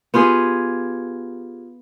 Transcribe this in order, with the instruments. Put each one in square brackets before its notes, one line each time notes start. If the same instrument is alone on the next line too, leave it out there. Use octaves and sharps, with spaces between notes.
[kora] B3 F4 G4 G#4